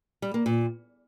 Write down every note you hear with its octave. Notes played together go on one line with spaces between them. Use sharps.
G3
A#3
A#2